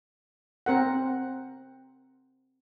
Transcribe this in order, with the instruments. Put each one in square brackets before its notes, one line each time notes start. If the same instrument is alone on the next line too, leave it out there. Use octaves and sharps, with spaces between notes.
[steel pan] C4 A#4 F#5